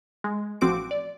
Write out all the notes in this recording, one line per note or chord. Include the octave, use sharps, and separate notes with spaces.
G#3
A1 F3 C4 F#4 D6 D7
D5